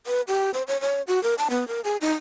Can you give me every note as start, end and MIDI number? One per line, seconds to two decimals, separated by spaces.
0.07 0.21 71
0.28 0.50 67
0.54 0.62 72
0.68 0.80 73
0.81 1.02 73
1.07 1.21 66
1.23 1.34 70
1.38 1.48 81
1.50 1.67 59
1.68 1.81 70
1.84 1.97 68
2.01 2.12 63